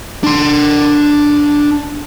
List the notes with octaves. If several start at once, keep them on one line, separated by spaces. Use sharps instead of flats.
D4 C6